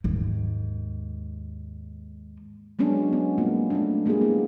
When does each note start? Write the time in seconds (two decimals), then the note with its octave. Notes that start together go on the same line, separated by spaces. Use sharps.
0.04 D#2 G#2
2.79 F#3 G#3 B3 C#4 D4
3.13 B3
3.38 G3 A#3 C4 F4
3.70 A3 A#3 D4
4.06 G#3 A#3 F4 G4 G#4
4.21 B3 E4